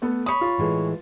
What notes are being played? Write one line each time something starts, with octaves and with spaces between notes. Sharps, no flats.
A3 B3 A4
C#5 B5 D#6
F4
A2 E3 G#3